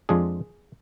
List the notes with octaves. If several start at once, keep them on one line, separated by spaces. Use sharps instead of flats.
F2 F3 G#3 D4 G#4